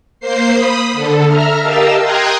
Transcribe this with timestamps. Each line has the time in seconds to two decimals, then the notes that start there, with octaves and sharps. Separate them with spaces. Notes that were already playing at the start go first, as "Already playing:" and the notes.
0.20 A#3 C5 C7
0.53 B5 D#6
0.92 D3 A4
1.26 E5 A#5 F6
1.61 G4 A#4 D#5 F5 A5 E6
2.02 G5 A#5 C6 D#6 F#6 G#6